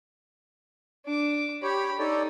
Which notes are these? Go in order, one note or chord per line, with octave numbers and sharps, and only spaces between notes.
D4 D6
G4 C#5 B5
D#4 A4 C#5 D5